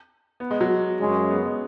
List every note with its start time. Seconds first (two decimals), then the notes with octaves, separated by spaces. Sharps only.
0.40 B3
0.51 G#3
0.61 F#3
1.00 F#2 C#3 G#3 C#4
1.31 B3
1.45 G#3